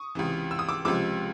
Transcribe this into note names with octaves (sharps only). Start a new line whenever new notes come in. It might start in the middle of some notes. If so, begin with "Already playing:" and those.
Already playing: C#6 D#6
C#2 C3 E3
E6
D#6
D6 E6
C#2 C3 F3 G#3 D6 E6